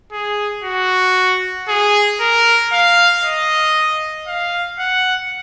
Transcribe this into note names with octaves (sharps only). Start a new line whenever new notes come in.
G#4
F#4
G#4
A#4
F5
D#5
F5
F#5